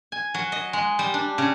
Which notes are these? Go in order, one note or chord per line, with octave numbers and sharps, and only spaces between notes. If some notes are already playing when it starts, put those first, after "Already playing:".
G#5
F#3
D#5
G#3
G3
D4
C#3